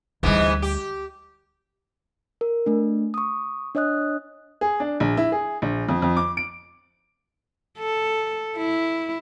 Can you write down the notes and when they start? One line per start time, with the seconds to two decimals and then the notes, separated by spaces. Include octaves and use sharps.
0.23 D2 G#2 E3 G3 B3
0.62 G4
2.41 A#4
2.66 A3 D4
3.14 C#6 D#6
3.75 D4 C#5 D#5 D#6 F#6
4.61 G#4
4.80 D4
5.00 A#1
5.17 E4
5.32 G#4
5.62 A#1
5.89 F2
6.02 F2
6.17 D6
6.37 D7
7.79 A4
8.57 E4